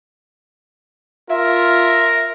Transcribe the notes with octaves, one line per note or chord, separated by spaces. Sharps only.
F4 A#4 E5